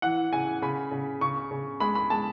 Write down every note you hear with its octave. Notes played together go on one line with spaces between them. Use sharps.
E3 F#5
C#3 G#5
C#3 B5
C#3
C#3 C#6
C#3
G#3 B5
B5
G#3 A5